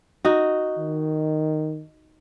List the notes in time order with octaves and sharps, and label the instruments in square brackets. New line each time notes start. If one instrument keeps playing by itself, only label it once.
[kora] D#4 F#4
[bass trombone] D#3